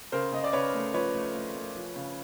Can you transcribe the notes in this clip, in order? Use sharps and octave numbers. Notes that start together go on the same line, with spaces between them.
C#3 A#4 C5
C#3 D#5
D5
C#3 B4 C#5
A3
F3 B4 C#5
A3
A3
A3
F3
C#3